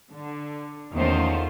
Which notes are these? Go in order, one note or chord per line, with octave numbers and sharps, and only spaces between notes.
D3
E2 D#3 A3 C#4 F4 C5